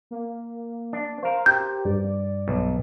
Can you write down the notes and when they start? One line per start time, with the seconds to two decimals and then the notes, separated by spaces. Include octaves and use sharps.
0.11 A#3
0.93 D4
1.23 A#4 C5 F5
1.46 G4 G6
1.85 G2 D5
2.48 B1